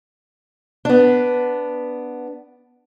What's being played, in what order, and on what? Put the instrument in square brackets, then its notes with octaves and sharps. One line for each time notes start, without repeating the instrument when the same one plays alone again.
[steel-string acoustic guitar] B3 D4